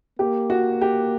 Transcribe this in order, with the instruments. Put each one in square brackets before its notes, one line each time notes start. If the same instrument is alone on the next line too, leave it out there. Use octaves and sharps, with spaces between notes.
[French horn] A#3 [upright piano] G4
[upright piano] F#4
G4